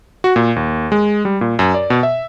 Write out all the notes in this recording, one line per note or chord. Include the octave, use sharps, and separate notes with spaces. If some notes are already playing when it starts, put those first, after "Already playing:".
F#4
A#2
D#2
G#3
G3
A#2
F#2
D5
B2
E5